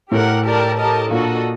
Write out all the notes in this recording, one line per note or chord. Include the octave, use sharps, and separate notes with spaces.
A2 A3 G4 A#4 F#5
G4 A#4 D5 A5
G4 A#4 D#5 A5
A#2 A#3 D4 F#4 A4 D#5